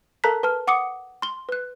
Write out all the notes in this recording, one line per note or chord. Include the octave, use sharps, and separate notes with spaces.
A4 A#4 A5 A#5 F#6 B6
B4 A5 F6
F#5 D6 D#6 C#7
C6 G7
B4 F#6